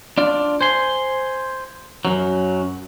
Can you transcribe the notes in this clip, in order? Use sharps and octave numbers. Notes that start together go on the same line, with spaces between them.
D4 F4 D5
C5 G#5 C6
F#2 F#3